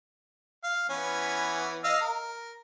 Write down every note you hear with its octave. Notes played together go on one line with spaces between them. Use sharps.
F5
E3 B3 C#4
D#5 F5 E6
A#4